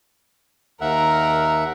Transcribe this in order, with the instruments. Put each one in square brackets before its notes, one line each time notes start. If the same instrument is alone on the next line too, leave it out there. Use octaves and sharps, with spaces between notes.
[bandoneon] D#2 E5 F#5 [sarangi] A#4